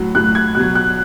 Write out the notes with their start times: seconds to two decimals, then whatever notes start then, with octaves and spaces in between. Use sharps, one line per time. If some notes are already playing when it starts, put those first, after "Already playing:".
Already playing: A2 F#3
0.15 A2 F#3 F#6
0.35 G#6
0.55 B2 F#3 F#6
0.75 F#6